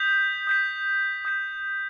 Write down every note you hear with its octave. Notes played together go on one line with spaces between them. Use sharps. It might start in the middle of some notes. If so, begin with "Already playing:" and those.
Already playing: D#6 G6 B6
D#6 G6 B6
D#6 G6 B6